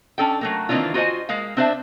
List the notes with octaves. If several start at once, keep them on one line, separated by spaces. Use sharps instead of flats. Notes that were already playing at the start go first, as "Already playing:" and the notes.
C#4 D4 A4 D5 G5
F#3 A3 A#3
D#3 E3 A#3 C4 D4 F4
F4 F#4 C5 D#5 G#5
G#3 A#3 F5
C4 D4 C5 D5 E5